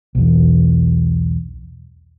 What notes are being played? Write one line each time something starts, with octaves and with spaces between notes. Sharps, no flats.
B1 E2